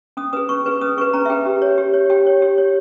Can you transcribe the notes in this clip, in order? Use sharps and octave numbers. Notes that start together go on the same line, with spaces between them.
C#4 D#6
G#4 B4 D#6
C#4 C#6
G#4 B4
C#4 D#6
G#4 B4 C#6
C#4 A#5
E5
G#4 B4 G5
G4
C#5
G4
C#5
G4 G5
C#5
G4
C#5